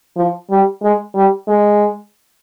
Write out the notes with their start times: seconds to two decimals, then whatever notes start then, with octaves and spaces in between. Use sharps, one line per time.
0.16 F3
0.50 G3
0.82 G#3
1.15 G3
1.48 G#3